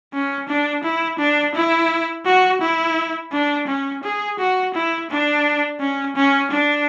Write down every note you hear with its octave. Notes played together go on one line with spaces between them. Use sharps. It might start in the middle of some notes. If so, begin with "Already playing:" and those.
C#4
D4
E4
D4
E4
F#4
E4
D4
C#4
G#4
F#4
E4
D4
C#4
C#4
D4